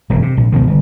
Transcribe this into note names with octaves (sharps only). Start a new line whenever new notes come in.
E1 F#2 C#3
C3
A#1
C#2 B2 D#3 F3
G1